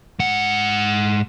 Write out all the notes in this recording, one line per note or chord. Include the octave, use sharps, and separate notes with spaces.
G#2 F#5